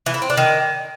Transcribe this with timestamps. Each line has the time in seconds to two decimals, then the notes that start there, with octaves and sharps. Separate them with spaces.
0.06 E3
0.14 E4
0.22 C4
0.30 D4
0.37 D#3